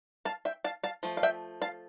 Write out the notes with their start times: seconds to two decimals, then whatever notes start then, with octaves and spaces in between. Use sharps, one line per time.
0.25 F5 A5
0.45 E5 G5
0.64 F5 A5
0.83 F5 A5
1.03 F3 A3
1.17 F5
1.23 E5 G5
1.62 F5 A5